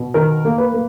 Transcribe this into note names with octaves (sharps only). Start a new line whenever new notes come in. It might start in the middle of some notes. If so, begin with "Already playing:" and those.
Already playing: B2
D#3 A#4
A#3
B4
A#3